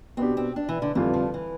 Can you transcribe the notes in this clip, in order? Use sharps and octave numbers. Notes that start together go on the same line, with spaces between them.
B2 B3 C4 D4 G4
C4
D4
E3
D3
F2 D3 E3 G3 D4 F4
F3
E3